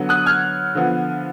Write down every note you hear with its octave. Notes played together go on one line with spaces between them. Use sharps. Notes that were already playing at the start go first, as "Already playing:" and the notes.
Already playing: D3 F#3 B3
D#6 F#6
F6 G#6
D3 F3 B3